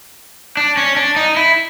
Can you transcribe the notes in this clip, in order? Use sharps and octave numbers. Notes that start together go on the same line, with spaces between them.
D4
C#4
D4
D#4
E4